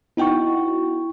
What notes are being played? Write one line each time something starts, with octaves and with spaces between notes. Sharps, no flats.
B3 D#4 E4 F#4 G5 C#6